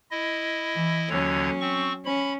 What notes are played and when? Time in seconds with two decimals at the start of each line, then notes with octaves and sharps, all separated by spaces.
0.11 E4 D#5
0.75 E3
1.09 D#2 D3 F#3 C#4 C#5
1.61 C4 C#6
2.05 C#4 B5